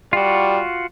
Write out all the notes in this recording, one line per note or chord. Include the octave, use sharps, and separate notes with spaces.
G3 F4 F#4